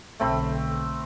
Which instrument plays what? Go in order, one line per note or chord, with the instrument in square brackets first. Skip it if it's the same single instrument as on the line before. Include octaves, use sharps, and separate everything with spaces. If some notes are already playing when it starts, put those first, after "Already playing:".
[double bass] B1 D3 [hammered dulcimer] A3 C4 B5